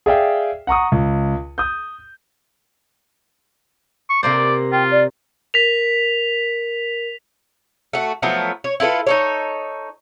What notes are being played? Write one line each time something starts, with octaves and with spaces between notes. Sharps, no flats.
G#4 D5 E5 F5 G5
F#5 A#5 C#6 D#6
C#2
D#6 G6
C#6
C3 A#3 C5 D5
F4 G5
D5
A#4 B6 F7
A3 F#4
F3 F#3 A3 B3
C#5
E4 F4 A4 B4
D#4 A4 C#5